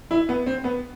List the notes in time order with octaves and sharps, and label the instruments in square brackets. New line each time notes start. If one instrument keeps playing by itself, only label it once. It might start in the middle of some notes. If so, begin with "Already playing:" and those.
[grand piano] E4
B3
C4
B3